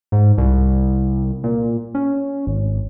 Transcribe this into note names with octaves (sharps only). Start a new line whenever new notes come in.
G#2
C2
A#2
C#4
G#1